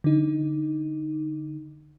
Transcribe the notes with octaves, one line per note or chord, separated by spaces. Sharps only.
D3 D#4